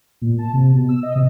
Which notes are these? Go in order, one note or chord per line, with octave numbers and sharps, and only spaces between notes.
A#2
A5
C3
B2
E6
D#5
C3